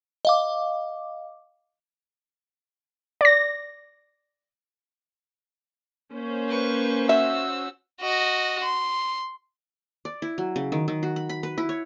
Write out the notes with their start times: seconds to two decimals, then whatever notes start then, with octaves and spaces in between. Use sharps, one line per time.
0.25 D#5 F5 D6
3.21 D5 A#6
6.13 A#3 C#4 C5
6.48 B4 C#6
7.09 F#4 E5 E6
8.01 F#4 D#5
8.63 C6
10.05 D5
10.22 E4
10.38 F#3
10.56 C#3
10.72 D#3
10.88 D#3
11.03 F#4
11.16 B5
11.29 B5
11.43 B4
11.58 E4
11.69 C#5